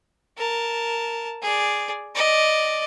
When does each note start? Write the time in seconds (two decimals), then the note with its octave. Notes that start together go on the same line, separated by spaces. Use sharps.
0.38 A#4 A5
1.42 G#4 D5
2.15 D5 D#5